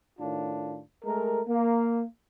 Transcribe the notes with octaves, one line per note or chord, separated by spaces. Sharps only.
A2 D#3 D4 F4
G#3 A3 A#4
A#3